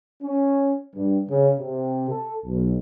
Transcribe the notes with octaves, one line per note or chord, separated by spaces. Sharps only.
C#4
G2
C#3
C3
A4
B1